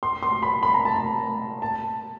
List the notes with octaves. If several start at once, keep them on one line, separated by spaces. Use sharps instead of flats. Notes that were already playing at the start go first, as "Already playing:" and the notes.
C6
C6
B5
B5
A#5
A5
A#5
A5